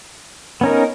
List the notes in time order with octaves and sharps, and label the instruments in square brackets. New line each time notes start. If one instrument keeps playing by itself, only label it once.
[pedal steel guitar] B3 C#4 D#4 [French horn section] A#4